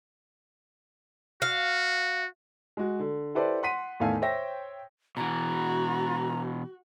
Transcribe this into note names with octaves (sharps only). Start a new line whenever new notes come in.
F#4 F5
G#3 F#4
D3
E4 G4 A4 B4 C5 D5
F#5 C6 B6 D#7
E2 A2 D#3 A4 F5 G#5
C5 C#5 E5 G5 A#6
B2 E3 F#4 A#5